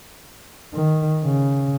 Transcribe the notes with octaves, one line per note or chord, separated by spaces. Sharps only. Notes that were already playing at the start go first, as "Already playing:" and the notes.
D#3
C#3